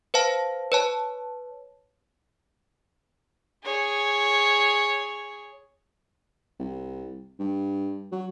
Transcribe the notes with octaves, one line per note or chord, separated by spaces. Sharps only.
B4 C5 F5 A5
B4 C#5 A5
G#4 C#5
C2
G2
F#3